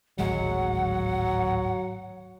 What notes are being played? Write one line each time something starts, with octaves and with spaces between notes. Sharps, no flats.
D1 G#1 F#3 G#3 F#5